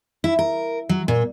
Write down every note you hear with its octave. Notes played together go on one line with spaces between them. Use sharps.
E4
A#4
F#3
A#2